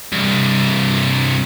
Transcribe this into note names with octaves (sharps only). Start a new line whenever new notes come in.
C2 G2